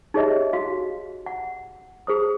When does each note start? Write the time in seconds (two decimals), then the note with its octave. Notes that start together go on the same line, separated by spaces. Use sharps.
0.14 D#4 G4 G#4 C#5 D#5 E5
0.53 F#4 F5
1.26 F#5
2.07 G#4 C5 D#6